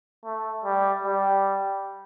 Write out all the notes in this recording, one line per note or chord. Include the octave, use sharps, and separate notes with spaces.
A3
G3
G3